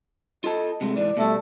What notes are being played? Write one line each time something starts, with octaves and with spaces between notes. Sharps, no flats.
F4 A4 D#5 A5
C3 G#3 A3
G#2 E3 D5
B2 G3 A3